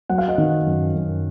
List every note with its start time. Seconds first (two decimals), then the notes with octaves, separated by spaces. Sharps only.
0.09 F#3 F#5
0.18 F5
0.28 D#5 F#5
0.38 D#3
0.66 F#2
0.94 F#2